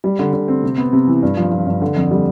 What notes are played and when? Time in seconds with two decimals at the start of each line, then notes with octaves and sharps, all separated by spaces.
0.04 G3
0.19 D3
0.33 D3
0.48 C4
0.63 C3
0.78 B3
0.93 C3
1.07 E3
1.23 G2
1.37 F3
1.52 F3
1.67 G2
1.82 D3
1.96 F2
2.11 G3